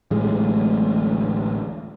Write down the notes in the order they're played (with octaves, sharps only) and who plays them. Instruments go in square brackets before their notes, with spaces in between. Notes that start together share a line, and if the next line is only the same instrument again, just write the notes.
[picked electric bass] D1 A1 A2 G#3